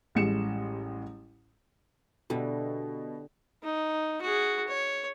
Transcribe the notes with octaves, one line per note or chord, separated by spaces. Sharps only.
A1 G3 G#3 C#7 E7
B2 D3 G3 E4
D#4
F#4 G#4
C#5